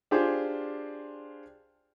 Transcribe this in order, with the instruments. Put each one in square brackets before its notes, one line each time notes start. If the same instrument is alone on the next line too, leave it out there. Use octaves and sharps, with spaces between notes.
[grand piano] D4 F4 G4 G#4 C5